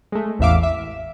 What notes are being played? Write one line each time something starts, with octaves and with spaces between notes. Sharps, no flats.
G#3 A3
A1 E2 A2 E5 F5 D6
E5